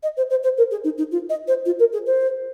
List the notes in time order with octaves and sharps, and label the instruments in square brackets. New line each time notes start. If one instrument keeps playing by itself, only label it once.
[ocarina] D#5
C5
C5
C5
A#4
G#4
D#4
D#4
F4
D#5
C5
F4
A#4
G#4
C5